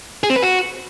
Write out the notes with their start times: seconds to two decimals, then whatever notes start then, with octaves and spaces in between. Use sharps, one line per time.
0.24 G#4
0.30 C4
0.36 B4
0.42 F#4